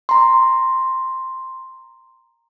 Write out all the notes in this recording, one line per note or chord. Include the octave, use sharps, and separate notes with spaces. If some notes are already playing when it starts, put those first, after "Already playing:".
A#5 C6